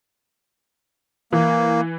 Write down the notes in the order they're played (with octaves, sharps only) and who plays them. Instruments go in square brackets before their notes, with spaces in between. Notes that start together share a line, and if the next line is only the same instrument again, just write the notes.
[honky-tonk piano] E3 [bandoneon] A#3